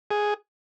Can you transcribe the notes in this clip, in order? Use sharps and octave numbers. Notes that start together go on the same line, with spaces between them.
G#4